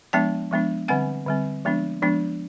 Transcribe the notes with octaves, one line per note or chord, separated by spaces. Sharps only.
F3 G#3 B3 D4 G5 A5
F3 G#3 B3 D4
D3 G3 C4 F#5 G#5
D3 G3 C4
F3 G#3 B3 D4
F3 G#3 B3 D4